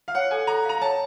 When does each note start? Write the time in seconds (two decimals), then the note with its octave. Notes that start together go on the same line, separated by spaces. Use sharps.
0.08 F5
0.15 C#5 F#5
0.31 A4 G#5
0.47 A4 A#5
0.65 F5 A#5
0.81 C#5 A5